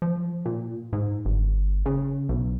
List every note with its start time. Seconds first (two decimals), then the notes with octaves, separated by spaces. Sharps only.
0.02 F3
0.45 A#2
0.93 G#2
1.25 G1
1.86 C#3
2.29 B1